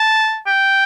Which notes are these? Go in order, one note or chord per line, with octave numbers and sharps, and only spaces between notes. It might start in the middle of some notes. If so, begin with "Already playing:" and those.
Already playing: A5
G5